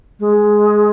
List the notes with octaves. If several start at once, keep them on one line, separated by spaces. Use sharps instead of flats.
G#3